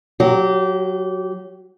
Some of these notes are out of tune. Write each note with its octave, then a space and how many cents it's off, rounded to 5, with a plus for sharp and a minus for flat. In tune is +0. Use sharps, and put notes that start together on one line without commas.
F#3 +0 G4 -25